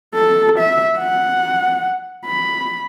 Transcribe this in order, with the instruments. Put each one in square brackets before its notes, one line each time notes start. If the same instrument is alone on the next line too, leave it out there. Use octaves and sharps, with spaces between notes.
[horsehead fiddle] A4
E5
F#5
B5